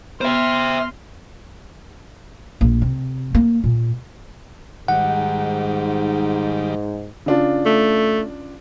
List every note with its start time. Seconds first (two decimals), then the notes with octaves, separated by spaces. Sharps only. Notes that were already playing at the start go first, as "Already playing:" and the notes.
0.21 B3 C5 E5 C6 F6
2.61 A#1
2.82 C3
3.35 A#3
3.64 A#2
4.88 G#2 D#3 G3 F#5
7.26 C#3 D4 F4
7.66 A3